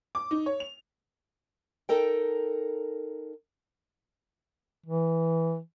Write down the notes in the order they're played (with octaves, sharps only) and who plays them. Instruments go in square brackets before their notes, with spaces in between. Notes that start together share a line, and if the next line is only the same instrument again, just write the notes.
[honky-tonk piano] D6
D#4
C#5
F7
[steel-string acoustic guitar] D#4 A4 A#4 G5
[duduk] E3